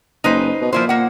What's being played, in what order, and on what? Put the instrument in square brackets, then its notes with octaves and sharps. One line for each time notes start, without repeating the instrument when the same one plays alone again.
[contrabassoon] F#1 [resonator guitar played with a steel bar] D#4 B4 C5
[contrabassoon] B2
[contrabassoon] A#2 [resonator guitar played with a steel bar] F3 E4 C5
[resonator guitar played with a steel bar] A#3 F#5